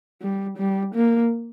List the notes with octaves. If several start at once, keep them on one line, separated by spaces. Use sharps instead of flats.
G3
G3
A#3